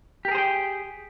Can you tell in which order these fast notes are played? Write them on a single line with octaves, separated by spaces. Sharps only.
G4 A#4 G#4 C5 G5